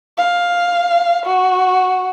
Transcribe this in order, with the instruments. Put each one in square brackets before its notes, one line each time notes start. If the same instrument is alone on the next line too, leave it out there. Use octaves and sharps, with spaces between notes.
[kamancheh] F5
F#4